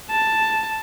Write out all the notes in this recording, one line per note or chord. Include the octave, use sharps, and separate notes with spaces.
A5